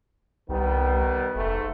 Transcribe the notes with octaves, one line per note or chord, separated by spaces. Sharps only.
C2 D#3 G3 B3
F1 G#2 A3